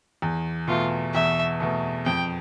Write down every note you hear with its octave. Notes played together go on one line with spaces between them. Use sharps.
E2
B2 A3 F4
E2 E5
B2 A3
F2 G5